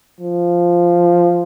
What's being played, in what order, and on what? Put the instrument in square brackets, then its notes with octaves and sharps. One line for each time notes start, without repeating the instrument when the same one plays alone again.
[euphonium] F3